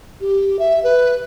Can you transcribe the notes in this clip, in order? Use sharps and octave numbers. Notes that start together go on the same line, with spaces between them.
G4
E5
B4